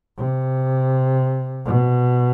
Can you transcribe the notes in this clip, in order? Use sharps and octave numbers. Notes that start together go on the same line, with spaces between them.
C3
B2